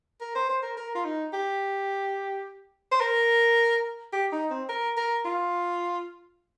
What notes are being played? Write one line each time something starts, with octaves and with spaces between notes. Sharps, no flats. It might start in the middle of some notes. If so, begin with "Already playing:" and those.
A#4
C5
C5
A#4
A#4
F4
D#4
G4
C5
A#4
G4
D#4
C4
A#4
A#4
F4